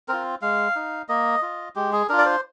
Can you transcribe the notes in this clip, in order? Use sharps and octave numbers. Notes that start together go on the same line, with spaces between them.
C4 F4 A#4
G#3 F5
D#4
A#3 D#5
F4
G#3 G4
G#4
D4 F4 A#4
D5
C5